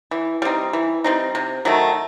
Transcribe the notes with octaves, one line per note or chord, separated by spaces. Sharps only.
E3
G3 C4 D#4
E3
G3 C4 D#4
C3
D#3 F#3 A3